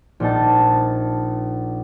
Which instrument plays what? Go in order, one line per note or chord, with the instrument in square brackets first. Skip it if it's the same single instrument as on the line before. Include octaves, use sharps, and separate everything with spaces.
[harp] A#1 D#4 A5